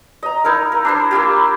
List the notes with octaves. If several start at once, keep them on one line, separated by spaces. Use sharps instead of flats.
D#5 A#5
D#4 E4 A#4 F5
A#4
D4 E4 C5
A#3 E4 F4 G4